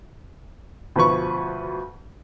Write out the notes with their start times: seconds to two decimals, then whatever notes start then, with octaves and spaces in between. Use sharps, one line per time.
0.96 D2 B2 F3 B4 C#6